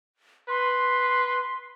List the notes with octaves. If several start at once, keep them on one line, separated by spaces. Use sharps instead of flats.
B4 C6